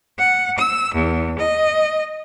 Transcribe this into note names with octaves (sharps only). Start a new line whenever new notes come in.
F#5
E6
E2
D#5